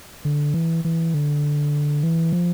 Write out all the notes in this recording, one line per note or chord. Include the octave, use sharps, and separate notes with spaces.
D3
E3
E3
D3
E3
F3